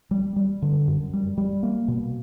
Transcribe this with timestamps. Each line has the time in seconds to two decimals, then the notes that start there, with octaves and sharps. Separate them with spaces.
0.11 G3
0.36 G3
0.62 D3
0.87 F#2
1.13 G3
1.38 G3
1.63 A#3
1.88 B2